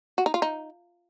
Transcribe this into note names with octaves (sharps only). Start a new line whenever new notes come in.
F#4
D#4
F4
D#4